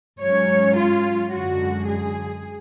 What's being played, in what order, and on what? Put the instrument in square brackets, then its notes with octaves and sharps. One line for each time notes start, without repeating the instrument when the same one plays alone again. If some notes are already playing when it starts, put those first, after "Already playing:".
[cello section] G#2 F#3 C#4 C#5
F4
F#2 D3 G#3 F#4
G#4